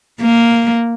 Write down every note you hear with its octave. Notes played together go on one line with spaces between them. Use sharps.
A#3